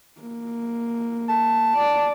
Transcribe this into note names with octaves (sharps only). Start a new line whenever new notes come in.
A#3
A5
D5